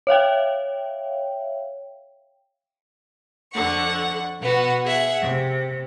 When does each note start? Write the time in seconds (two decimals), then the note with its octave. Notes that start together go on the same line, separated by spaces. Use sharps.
0.07 C#5 E5 F5 G5
3.52 F2 D3 F#5 C#6
4.41 B2 B3 F#4
4.85 G#4 E5 F#5
5.21 C3